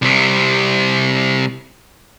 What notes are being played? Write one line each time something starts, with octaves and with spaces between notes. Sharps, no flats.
C2 C3